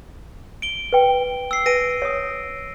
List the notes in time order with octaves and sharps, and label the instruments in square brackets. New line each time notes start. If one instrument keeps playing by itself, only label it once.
[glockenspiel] D7 G7
[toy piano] B4 G5
[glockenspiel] E6 C7
[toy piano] B4 G#5 [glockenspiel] A#6 D7 D#7
[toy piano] C#5 D#6